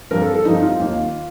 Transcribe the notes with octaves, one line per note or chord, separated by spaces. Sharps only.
G2 F3 C4 A#4
A4
A4
G2 F3 C4 D#4
D#4
F4
D#2 D#3 A#3